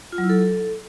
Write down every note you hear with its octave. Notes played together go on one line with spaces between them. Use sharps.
F4
F#3
E4
A4